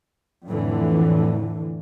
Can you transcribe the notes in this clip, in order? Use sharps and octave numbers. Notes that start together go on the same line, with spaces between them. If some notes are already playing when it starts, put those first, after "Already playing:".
F2 A2 D3 E3